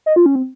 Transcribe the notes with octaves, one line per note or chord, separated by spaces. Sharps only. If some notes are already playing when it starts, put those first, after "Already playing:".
D#5
F4
C#4
C4